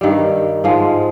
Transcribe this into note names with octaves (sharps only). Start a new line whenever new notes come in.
G2 D#3 G3
G#2 F3 G#3